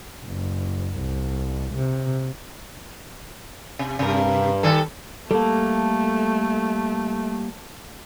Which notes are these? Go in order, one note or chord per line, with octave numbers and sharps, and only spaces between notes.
F#1
C2
C3
C3
G2 C3 A#4
D#3 G3 A4
G3 A3 A#3 A4